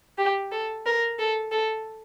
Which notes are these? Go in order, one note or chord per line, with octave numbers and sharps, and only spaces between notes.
G4
A4
A#4
A4
A4